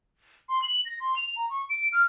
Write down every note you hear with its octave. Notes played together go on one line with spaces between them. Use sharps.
C6
F#7
A#6
C6
F7
A#5
C#6
D7
F6